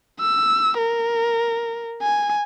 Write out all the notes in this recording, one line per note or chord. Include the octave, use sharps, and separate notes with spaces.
E6
A#4
G#5